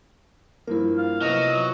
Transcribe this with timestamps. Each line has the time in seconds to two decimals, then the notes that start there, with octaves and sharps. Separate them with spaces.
0.67 G2 F3 A#3 E4 A#4
0.98 F5
1.22 C3 F3 F#3 B3 D#5